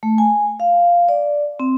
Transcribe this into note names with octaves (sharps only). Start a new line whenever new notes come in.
A3
G#5
F5
D5
C4